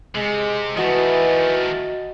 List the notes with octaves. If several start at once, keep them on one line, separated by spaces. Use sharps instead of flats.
C3 G#3
D#3 E3 A3 F#4 D#5